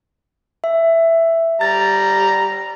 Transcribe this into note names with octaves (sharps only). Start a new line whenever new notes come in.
E5
G3 A#5 A6